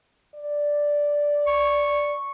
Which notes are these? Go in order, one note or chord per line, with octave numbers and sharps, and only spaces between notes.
D5
C#6